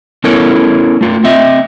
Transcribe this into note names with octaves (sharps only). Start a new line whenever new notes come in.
B3 C#4 E4 A4 A#4 C#5
A3 F4
C4 D#5 E5